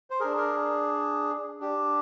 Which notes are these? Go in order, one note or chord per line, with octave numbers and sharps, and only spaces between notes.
C5
D4 G#4 A#4
A#4
D4 G4